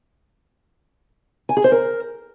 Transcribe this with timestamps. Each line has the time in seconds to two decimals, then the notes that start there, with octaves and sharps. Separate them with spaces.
1.49 G#5
1.57 G#4
1.64 C5
1.72 A#4